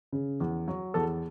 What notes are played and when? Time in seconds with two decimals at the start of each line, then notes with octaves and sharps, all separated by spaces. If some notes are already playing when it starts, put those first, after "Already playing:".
0.12 C#3
0.40 E2
0.68 F#3
0.94 E2 A4